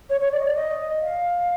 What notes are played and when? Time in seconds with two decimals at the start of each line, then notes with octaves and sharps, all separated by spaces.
0.10 C#5
0.20 C#5
0.32 D5
0.40 D#5
0.44 D5
0.56 D#5
1.02 F5